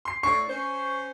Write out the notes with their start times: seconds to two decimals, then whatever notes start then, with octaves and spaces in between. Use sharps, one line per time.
0.05 C6 C7
0.23 A2 D4 C#6 C7
0.49 C#4 C5